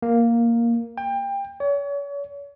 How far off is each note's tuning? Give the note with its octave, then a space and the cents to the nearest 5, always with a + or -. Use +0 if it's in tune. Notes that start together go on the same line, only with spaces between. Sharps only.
A#3 +0
G5 +25
C#5 +40